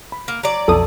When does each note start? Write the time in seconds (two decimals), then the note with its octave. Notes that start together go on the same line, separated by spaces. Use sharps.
0.12 B5
0.28 A#3
0.43 F#3 D5
0.68 B1 F2 A4 D#6